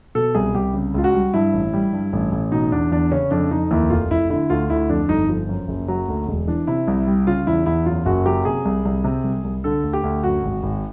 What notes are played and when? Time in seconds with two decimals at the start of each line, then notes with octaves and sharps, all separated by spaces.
0.15 B2 A4
0.35 C2 G#4
0.54 C2 G4
0.74 C#3
0.94 C#2 F4
1.04 F#4
1.14 G3
1.34 G2 E4
1.53 A1
1.73 G3
1.93 G2
2.13 A1
2.32 A1
2.52 B2 D#4
2.72 E2 D4
2.91 E2 D4
3.11 C#3 C#4
3.31 F2 D4
3.51 F2 D#4
3.71 D#2 E4
3.90 F1 F4
4.10 F1 E4
4.30 D3 E4
4.50 D2 F4
4.70 D2 E4
4.89 F2 D4
5.09 G1 D#4
5.29 F3
5.49 F#2
5.68 F#1
5.88 F#3
6.08 D2
6.28 E1
6.47 E3 D4
6.67 C3 E4
6.88 C2
7.07 G3
7.27 C#3 F4
7.47 E2 E4
7.66 E2 E4
7.86 F#2 F4
8.06 F#1 F#4
8.26 F#3 G4
8.45 C3 G#4
8.65 C2
8.85 C2
9.04 C3
9.24 C2
9.44 C2
9.64 D3 A4
9.84 D2
9.93 G4
10.04 D2
10.23 F#2 F#4
10.43 G#1
10.63 G#1